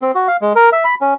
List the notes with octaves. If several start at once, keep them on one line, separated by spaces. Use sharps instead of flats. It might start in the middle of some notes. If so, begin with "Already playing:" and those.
C4
F#4
F5
G#3
A#4
E5
B5
C#4